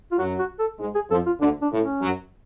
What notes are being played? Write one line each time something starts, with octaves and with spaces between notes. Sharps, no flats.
F4
F#2 F#3 F#4
F#4
A4
G#2 G#3
G#4
F2 F3 A4
F4
D2 D3 D4
D4
A2
C#4
F#2 F#3